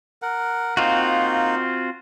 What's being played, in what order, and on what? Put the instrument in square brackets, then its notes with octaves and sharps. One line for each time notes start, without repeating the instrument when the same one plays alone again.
[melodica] A#4 F#5
[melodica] A#3 D#4 [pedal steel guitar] C4 F4 F#4